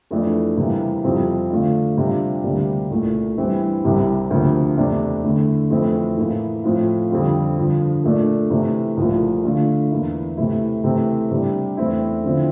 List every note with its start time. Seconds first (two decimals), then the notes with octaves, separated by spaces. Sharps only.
0.11 F2 E3 A3 D4
0.57 C3 E3 G3 A#3
1.04 F2 C3 G3 C4 F4
1.51 D3 A3 D4 F4
1.97 C3 G3 D4 F4
2.44 D2 C3 G3 A#3 D4
2.91 C2 A#2 A3
3.37 G2 E3 G3 C4 E4
3.84 C2 C3 G3
4.30 D2 C3 F3 A#3
4.77 E2 C3 E3 A3 D4
5.24 D3 A3 E4
5.70 F2 E3 A3 C4 E4
6.17 A2 E3 A#3 E4
6.64 A2 F3 C4 F4
7.10 F2 D3 G3 C4 F4
7.57 G2 D3 F3
8.04 A#2 A3 D4
8.50 C3 E3 A3
8.97 C2 A#2 F3 A3
9.44 D3 A3 D4 F4
9.91 E2 E3 A#3 E4
10.37 C3 E3 A3 E4
10.84 C3 E3 A3 C4
11.31 C3 G3 D4
11.77 E2 E3 A3 C4 E4
12.24 D3 F3 C4 E4